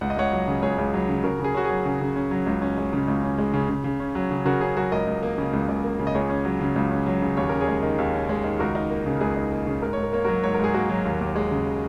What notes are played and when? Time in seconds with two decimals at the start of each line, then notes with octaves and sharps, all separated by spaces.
0.01 C#2 F#5
0.10 D#5
0.17 C#2 C#5 F#5
0.32 F#3
0.47 C#3
0.62 C#2 G#4 C#5
0.78 C#2
0.94 F#3
1.09 C#3
1.24 C#3 F#4 A#4
1.39 C#3
1.44 G#4
1.54 C#4 F#4
1.65 F#3 G#4
1.86 C#3
2.01 C#3
2.16 C#4
2.31 F#3
2.47 C#2
2.62 C#4
2.78 G#3
2.93 C#3
3.08 C#2
3.23 C#4
3.39 G#3
3.54 C#3
3.69 C#3
3.84 C#3
4.00 C#4
4.15 F#3
4.31 C#3
4.45 C#3 F#4 A#4
4.61 C#4 G#4
4.77 F#3 F#4 A#4
4.92 C#2 A#4 D#5
5.07 C#2
5.23 A#3
5.38 C#3
5.53 C#2
5.68 C#2
5.84 A#3
5.99 C#3
6.07 D#5
6.14 C#2 G#4 C#5
6.30 C#4
6.45 F#3
6.61 C#3
6.76 C#2
6.91 C#4
7.07 F#3
7.22 C#3
7.37 D#2 C#5
7.49 C#4 A#4
7.61 G#4 C#5
7.68 G#3
7.83 D#3
7.98 D#2
8.14 C#4
8.29 G#3
8.44 D#3
8.59 C#2 F#4 A#4
8.75 D#4
8.90 A#3
9.06 C#3
9.21 C#2 G#4
9.36 D#4
9.51 A#3
9.67 C#3
9.82 G#2 A#4
9.93 G#2 C#5
10.03 A#4
10.13 A#3 C#5
10.24 F#3 F#4 A#4
10.43 G#2 C#5
10.54 A#4
10.59 G#2 G#4
10.74 A#3 F#4 A#4
10.89 F#3
11.05 D#2
11.21 D#2
11.36 G#3
11.51 C#3